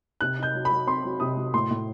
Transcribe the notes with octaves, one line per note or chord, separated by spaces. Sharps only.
C3 F#6
D#4 G6
F#3
B5
F#3
C4 C6
F#3
C3 D#6
F#3
A2 C6
A2